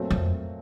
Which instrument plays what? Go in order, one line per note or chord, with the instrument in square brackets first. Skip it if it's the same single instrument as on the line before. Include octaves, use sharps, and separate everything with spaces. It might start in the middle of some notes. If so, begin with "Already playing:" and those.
Already playing: [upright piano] A#2 F#3 A3 C4
[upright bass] F2